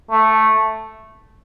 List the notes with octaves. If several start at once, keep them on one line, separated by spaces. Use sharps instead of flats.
A3